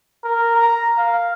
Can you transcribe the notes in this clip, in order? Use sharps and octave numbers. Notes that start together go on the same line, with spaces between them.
A#4
A#5
F5